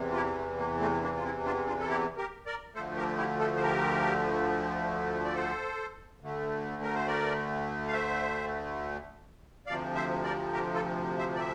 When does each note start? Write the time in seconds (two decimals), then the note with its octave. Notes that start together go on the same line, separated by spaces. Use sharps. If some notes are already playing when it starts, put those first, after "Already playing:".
Already playing: E2 C3 E3
0.12 F4
0.15 E4 G4
0.38 A3
0.58 A#3
0.80 A3 C4
1.02 A#3 D4
1.16 F4
1.24 C4 E4
1.45 D4 F4
1.67 D4 F4
1.79 A4
1.88 E4 G4
2.17 G4 A#4
2.46 A#4 D5
2.74 D2 D3 F3 A3 A4 C5
2.97 G4 A#4
3.18 E4 G4
3.39 F4 A4
3.56 C5
3.61 G4 A#4
5.25 D5
5.34 A4 C5
6.21 D2 D3 A3
6.83 A#4
6.95 C5
7.07 A#4 D5
7.88 F5
7.93 C5 E5
9.66 D2 C3 F3 D5 F5
9.95 C5 E5
10.24 A#4 D5
10.53 G4 A#4
10.74 F4 A4
11.18 C5 E5
11.36 D5
11.39 E5